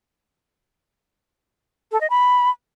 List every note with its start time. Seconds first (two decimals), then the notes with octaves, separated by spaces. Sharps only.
1.92 A4
2.01 D#5
2.10 B5